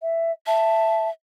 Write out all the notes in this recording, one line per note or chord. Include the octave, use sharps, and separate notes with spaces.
E5
E5 A5